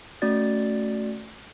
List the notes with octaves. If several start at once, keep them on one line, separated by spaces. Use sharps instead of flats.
A3 C#4 F#4 D5 A6